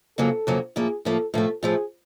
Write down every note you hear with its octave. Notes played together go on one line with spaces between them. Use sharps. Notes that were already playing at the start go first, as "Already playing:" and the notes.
F2 C#3 F#3 A#3 A4
F2 C#3 F#3 A#3
A2 F3 A#3 G#4
A2 F3 A#3 A4
A2 F3 A3 A4
A2 F3 A3 G#4